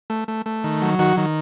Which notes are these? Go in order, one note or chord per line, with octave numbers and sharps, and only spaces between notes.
A3
A3
A3
D#3
F#3
D#3 F#4
D#3